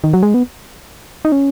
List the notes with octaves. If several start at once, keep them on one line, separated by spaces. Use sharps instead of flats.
D#3
F#3
G#3
B3
D#4
C#4